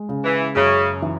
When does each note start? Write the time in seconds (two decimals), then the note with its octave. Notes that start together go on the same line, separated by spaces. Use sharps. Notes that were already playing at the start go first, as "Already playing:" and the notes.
Already playing: G#3
0.09 C#3
0.24 E3
0.55 F#2 C#3
1.02 E3